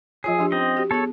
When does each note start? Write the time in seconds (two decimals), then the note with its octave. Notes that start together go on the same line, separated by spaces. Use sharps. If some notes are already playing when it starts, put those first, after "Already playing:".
0.24 F3 F4 G#4 C#5
0.39 F3 D4 G4
0.52 C4 C#4 D#5
0.77 F#4 G4
0.91 B3 G#4 A4 C#5